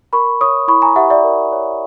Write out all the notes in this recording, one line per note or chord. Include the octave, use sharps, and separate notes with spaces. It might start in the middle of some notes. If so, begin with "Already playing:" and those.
A#4 B5 C#6
C#5 C#6 D#6
E4 B5 C#6
G#5 A#5
G4 E5 F#5
D5 E5
A#4
C#5